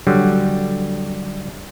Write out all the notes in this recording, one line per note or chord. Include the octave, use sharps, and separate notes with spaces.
D3 F#3 G3